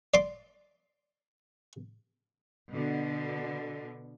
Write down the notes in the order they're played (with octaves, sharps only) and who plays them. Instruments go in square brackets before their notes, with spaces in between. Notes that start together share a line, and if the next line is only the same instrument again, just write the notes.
[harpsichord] D5 C6 D6
[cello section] B2 D3